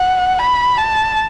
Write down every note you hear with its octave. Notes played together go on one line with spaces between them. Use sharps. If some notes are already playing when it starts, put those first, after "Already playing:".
Already playing: F#5
B5
A5